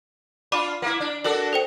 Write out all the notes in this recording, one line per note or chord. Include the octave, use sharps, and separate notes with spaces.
D4 F4 B5 D6 D#7
A#3 E4
D4
D4 F#4 A4 A#4
A4 C5 G5